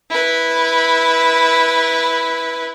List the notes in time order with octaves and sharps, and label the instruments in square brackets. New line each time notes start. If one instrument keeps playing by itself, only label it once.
[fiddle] E4 B4